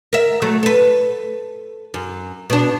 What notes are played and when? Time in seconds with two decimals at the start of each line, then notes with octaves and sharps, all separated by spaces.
0.13 A#4 E5
0.42 F#3 A3
0.63 A4 B4
1.94 F#2
2.50 B2 D4